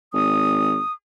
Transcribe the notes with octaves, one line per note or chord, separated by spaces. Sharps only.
G#1 D#6